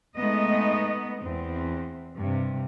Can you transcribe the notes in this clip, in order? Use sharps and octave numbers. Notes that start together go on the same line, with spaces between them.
G#3 A3 B3 D#4 D#5
E2 C4
G2 C3